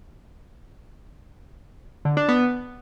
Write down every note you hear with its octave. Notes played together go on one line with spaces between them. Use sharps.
D3
D4
B3